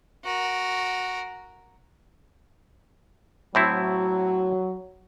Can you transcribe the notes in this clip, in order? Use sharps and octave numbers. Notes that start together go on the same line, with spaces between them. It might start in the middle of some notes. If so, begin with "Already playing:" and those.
F#4 A#4
A2 F#3 C4 E4